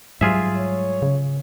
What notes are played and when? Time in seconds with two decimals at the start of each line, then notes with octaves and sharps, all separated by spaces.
0.21 G#2 F#3 G3 F4 G#4 E5
0.56 C#5
1.02 C#3